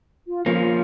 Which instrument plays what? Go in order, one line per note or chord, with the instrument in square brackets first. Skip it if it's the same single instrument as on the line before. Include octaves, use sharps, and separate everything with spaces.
[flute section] F4
[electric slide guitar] F3 A#3 C#4 [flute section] F4